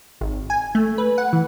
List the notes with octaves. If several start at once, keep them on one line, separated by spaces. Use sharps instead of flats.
G#1
G#5
A3
B4
F#5
E3